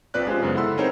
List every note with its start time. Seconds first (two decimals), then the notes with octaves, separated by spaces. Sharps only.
0.14 A#1 F3 C4 B4 D5 F#6
0.27 G#3 C#4 F4 G4 C5
0.43 F#2 C#3 B3
0.55 E4 A4 F#5 B5 C6 E6
0.77 C4 D#4 G#4 A#4 C5 C#5